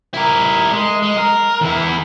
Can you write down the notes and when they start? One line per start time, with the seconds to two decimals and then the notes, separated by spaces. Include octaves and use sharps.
0.14 E4 A#4
0.72 G#3
1.02 G#3
1.18 A#4
1.61 E2 E4